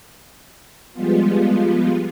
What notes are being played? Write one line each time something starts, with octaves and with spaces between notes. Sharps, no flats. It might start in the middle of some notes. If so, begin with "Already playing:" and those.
F3 G3 G#3 B3 F4